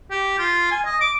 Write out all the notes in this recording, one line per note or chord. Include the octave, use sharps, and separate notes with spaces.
G4
F4
G#5
D#5
D6